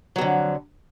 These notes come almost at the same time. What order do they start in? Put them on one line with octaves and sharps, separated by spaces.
F#3 F2 D3